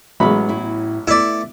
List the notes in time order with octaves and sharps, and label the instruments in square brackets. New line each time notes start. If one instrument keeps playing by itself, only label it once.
[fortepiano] A1 F#3 B5 [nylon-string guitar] G#3 B3
[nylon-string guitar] A2 E4
[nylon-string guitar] A3 B3 [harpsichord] E4 D5